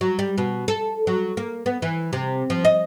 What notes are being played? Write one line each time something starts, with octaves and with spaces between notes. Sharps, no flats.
F#3
G3
B2
A4
F#3
A#3
B3
E3
C3
F3
D#5